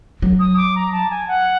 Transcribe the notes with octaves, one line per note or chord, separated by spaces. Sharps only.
F#3
D#6
D6
A#5
A5
G#5
F#5